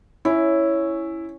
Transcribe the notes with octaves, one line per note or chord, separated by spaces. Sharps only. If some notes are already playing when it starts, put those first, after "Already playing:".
C#4 E4